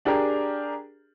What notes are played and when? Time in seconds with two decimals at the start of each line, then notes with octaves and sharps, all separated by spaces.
0.05 D4 G4 G#4 A#4